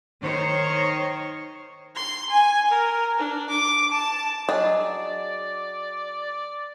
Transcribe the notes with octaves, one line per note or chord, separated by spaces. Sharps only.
D#3 C5 C#5
C6
G#5
A#4
D4
D6
A5
F#3 D4 G#4 D5 D#5 D#6